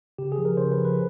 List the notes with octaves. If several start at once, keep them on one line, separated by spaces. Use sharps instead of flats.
C#3 G4
G#4
F3
A#4
C#3 C5
B4
F3
B4